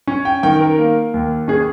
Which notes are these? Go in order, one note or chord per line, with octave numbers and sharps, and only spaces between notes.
C#4
G5
D#3 G5
A#4
A#3
D#2
C#4 G#4